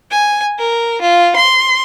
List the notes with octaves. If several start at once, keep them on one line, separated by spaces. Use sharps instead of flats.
G#5
A#4
F4
C6